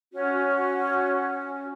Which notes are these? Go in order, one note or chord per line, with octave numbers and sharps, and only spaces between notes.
C#4 F#4